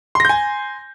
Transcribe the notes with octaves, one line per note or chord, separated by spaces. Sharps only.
G#5 C6 G6 A#6